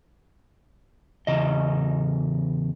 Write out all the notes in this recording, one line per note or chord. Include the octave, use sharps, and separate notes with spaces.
E2 C#3 D#5